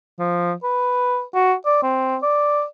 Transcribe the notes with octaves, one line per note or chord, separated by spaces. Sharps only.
F3
B4
F#4
D5
C4
D5